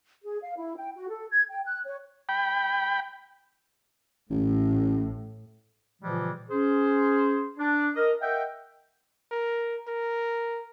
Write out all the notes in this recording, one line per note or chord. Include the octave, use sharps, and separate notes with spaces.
G#4
F5
E4
G5
F#4
A4
G#6
G5
F#6
C#5
G5 B5
A1 A2
A#2 C#3 E3 F3 G3 G#3
C#4 G#4 C5
D4
A#4 D#5
A#4 D#5 E5 F#5 G5
A#4
A#4